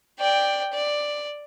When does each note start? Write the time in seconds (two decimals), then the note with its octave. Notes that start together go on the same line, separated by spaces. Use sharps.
0.19 D5 G5
0.74 D5